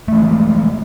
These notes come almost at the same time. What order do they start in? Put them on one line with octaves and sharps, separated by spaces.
A3 E3 G#3